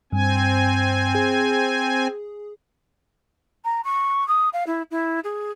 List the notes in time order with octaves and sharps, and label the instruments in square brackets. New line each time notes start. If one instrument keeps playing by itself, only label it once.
[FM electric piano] G2 [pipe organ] C4 G#5
[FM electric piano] G#4
[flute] A#5
C#6
D#6
F5
E4
E4
G#4